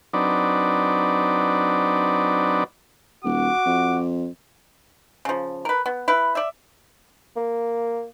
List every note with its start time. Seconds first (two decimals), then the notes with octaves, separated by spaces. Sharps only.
0.14 F#3 C4 D4 D#4 B4 D5
3.24 D#1 F#4 D6
3.66 F2
5.25 C#3 F3
5.65 A#4 B4
5.86 B3
6.08 E4 B4
6.35 D5 E5
7.36 A#3